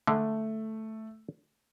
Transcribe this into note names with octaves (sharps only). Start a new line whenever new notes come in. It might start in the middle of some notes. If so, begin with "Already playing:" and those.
D3 G#3 A3